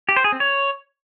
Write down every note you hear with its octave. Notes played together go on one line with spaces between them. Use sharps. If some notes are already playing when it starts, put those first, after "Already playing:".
G4
C5
G#4
C4
C#5